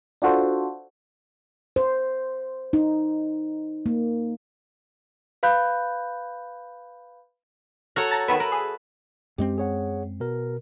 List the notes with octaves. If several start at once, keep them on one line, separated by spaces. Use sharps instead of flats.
D4 F4 F#4 A4 C5
C5
D#4
A#3
B4 F5 B5 F#6 G6
F#4 A4 A#4 C#5
A5 A#5
D#3 B3 B4 E5
A#4 B4
G#4
F#2 G#3 C4 G4
G#4 C#5 F#5
B2 A#4